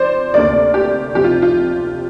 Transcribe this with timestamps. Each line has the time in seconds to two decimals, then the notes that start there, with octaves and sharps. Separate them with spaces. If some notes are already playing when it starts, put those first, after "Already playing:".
Already playing: F2 F3 C5 D5
0.34 D2 C3 A#3 D4 D5
0.74 G4
1.15 F2 C3 F3 G4
1.24 F4
1.42 F4